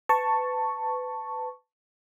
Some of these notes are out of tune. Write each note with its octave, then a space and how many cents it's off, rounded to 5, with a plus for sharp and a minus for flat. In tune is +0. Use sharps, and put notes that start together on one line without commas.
B4 +25 A5 +10 C#6 +0